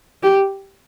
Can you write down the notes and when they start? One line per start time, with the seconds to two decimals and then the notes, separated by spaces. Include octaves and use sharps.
0.23 G4